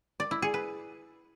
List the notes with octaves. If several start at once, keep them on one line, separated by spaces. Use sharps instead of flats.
D5
E4
G#4
B4